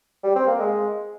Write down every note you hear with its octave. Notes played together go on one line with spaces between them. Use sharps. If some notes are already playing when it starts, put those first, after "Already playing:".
G3
C4
A#3
G#3